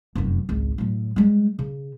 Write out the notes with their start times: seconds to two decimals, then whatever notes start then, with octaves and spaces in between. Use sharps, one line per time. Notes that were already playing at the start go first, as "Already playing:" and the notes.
0.15 F1 F#2
0.49 G#1 C#2
0.78 A2 F#3
1.16 G3 G#3
1.59 C#3